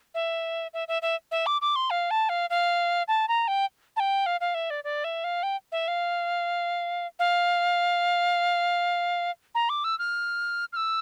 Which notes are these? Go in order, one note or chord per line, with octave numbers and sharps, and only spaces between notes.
E5
E5
E5
E5
E5
D6
D6
C6
F5
A5
F5
F5
A5
A#5
G5
A5
G5
F5
F5
E5
D5
D5
E5
F5
G5
E5
F5
F5
A#5
D6
E6
F6
F6
E6